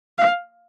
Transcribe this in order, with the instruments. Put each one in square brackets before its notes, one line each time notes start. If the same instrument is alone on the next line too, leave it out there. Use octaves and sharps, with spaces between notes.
[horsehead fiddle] F5